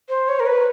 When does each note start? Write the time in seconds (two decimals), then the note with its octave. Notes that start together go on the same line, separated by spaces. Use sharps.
0.09 C5
0.28 C#5
0.40 A#4
0.46 B4